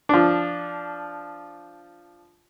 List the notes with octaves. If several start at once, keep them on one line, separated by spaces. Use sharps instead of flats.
F3 D4